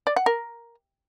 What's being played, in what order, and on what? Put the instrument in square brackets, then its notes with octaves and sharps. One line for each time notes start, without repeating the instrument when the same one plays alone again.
[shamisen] D5
F#5
A#4